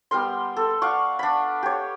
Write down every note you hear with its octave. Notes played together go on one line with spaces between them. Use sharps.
G3 B3 A#4 C6
A4
D5 F5 F#5 C#6
D4 B5
G4 C#5